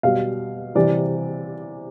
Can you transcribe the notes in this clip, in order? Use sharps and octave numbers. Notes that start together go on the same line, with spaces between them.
B2 G3 F5
C3 E3 G3 D5